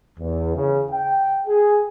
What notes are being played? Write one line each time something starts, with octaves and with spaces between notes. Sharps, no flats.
E2
C#3
G5
G#4